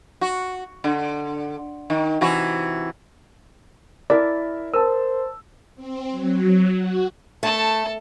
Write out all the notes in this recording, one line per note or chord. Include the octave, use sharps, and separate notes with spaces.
F#4
D3
D#3
C3 E3 F#4
E4 A#4 D5 E5
A#4 C5 A5 E6
C4
F#3
F#4
A3 A4 A5